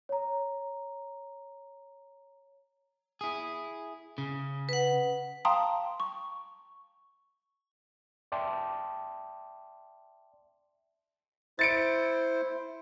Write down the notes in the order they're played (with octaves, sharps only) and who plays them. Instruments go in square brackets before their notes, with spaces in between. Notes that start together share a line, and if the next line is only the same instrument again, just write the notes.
[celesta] C#5 A#5
[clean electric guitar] E4 G#4
C#3
[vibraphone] B4 F#5
[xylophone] F5 G5 A5 A#5 C6 D#6
C#6
[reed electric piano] D5 E5 G5 A5 C6 D6
[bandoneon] E4 C5 [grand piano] A6 C#7 D7